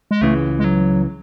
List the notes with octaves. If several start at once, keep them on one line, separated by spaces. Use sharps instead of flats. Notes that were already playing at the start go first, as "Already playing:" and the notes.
G#3
C#2 C#3 E3 A3
G#3
F#3